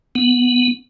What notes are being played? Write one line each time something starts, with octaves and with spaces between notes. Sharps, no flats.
B3